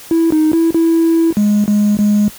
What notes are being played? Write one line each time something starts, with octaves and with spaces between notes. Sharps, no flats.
E4
D#4
E4
E4
G#3
G#3
G#3